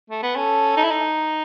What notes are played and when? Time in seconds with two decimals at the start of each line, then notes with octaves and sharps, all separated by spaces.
0.10 A3
0.22 B3
0.35 C#4 A4
0.77 D#4
0.84 E4
0.91 D#4